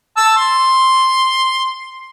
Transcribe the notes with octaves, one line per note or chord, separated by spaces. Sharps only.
A5 E6
C6